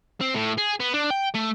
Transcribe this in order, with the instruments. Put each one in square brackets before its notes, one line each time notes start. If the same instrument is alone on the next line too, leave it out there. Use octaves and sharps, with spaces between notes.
[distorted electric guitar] C4
A2
G#4
B3
D4
G5
A3